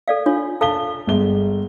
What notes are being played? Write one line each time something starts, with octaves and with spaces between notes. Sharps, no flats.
A4 D5 F5
D4 F4 C#5
A4 F5 A5 G7
G1 G#3 G7